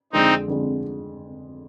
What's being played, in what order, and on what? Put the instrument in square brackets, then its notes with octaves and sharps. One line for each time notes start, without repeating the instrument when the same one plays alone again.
[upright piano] F2 D3 G#3 [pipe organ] C4 D#4
[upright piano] F2 D3 G#3